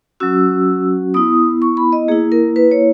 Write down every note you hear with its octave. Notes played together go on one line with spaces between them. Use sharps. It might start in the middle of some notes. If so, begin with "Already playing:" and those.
F#3 C#4 F#4 E6
B3 E4 D#6
C#6
B5
D#5
A#3 E4 G#4
A#4
B4
C#5